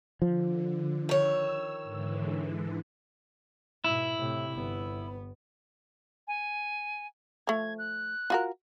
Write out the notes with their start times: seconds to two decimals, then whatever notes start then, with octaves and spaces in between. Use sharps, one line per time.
0.22 D3 F3
1.09 D#3 C#5 E6
1.83 G#2 D3 E3
3.84 G#2 B2 E4
4.17 A2 C3
4.52 G1 B3
6.28 G#5
7.47 F3 A3 G#6
7.78 F#6
8.30 F4 F#4 A#4